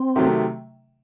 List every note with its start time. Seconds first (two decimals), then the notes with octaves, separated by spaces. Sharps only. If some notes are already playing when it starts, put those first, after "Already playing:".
Already playing: C4
0.16 C3 D#3 F#3 A3